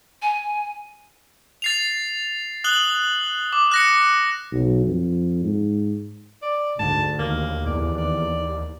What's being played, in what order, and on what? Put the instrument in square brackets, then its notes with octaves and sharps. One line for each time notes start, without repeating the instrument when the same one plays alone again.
[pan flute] G#5
[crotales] A6 C7 F7
D#6 F#6 F#7 G7
D6
F#6 A#6 C#7
[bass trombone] B1
F2
G#2
[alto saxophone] D5
[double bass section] D2 [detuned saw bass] G#2 [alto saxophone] A5
[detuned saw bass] D#2 [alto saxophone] A#3
[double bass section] E2 [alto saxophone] D5
[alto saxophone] D5